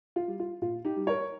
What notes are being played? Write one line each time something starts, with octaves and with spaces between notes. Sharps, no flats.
F4
G3
F4
A#2 F4
D#4 G4
G3
A#4 C#5